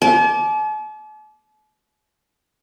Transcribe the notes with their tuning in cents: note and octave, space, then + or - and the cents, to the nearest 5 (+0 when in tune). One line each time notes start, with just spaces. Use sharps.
A5 -45 D6 -5